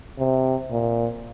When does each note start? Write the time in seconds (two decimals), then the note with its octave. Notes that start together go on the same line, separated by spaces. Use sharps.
0.18 C3
0.71 A#2